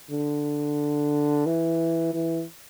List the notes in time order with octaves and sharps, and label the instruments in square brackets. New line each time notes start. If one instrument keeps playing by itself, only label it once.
[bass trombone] D3
E3
E3